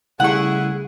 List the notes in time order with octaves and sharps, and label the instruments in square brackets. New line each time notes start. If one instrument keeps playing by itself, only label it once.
[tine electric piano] C#3 G3 A3 [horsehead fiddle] E4 G#4 [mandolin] F#5 C#6